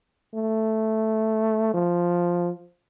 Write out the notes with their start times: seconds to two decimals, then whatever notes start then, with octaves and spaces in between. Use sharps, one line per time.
0.34 A3
1.74 F3